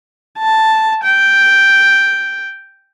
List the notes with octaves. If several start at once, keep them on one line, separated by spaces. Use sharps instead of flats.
A5
G5